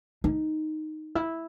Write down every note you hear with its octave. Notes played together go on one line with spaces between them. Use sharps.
D#4
E4